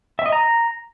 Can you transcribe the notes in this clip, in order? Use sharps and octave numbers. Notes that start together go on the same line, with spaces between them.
E5
D#5
A#5